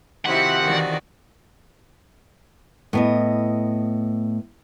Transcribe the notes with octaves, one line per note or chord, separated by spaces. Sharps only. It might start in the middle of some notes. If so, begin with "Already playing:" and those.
C3 D#3 F3 C4 E4 F#4 G4 F#5
D#3 E3 F#4 D5
A2 B3 D#5